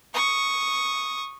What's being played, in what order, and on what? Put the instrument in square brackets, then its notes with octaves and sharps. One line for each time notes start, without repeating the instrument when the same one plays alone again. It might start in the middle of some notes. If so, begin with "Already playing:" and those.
[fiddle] C#6 D#6